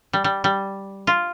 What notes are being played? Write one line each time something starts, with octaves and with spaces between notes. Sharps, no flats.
G3
G3
G3
F4